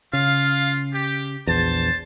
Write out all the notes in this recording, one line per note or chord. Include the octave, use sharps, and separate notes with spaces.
C#3 F4 F5
G4
A#1 E2 C5 A5